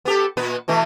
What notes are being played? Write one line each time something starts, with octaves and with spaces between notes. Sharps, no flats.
B3 G4 A4
A#2 B3 B4
B2 E3 A3